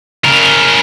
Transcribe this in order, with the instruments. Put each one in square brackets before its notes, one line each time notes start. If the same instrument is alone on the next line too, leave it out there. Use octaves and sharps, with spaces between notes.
[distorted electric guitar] C#3 A#4